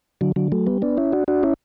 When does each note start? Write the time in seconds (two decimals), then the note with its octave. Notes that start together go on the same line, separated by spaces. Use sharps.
0.21 D3 F#3
0.36 D3 F#3
0.52 F#3 A3
0.67 G3 B3
0.82 B3 D4
0.97 C#4 E4
1.12 D4 F#4
1.28 D4 F#4
1.43 C#4 E4